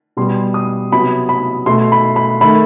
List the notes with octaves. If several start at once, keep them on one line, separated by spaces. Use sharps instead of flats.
B2 G3 B3 C6
D#6
C3 F#3 B3 B5
B5
B2 A3 C6
B5
B5
D#3 A3 B5